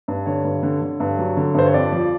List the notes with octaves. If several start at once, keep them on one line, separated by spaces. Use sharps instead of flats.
G2
D3 C#5
G2
D3
D3
G2
F#3
D3
G2 C5
C#5
F2 D5
F3